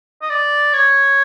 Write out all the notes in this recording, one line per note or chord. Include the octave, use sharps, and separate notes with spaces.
D#5
D5
C#5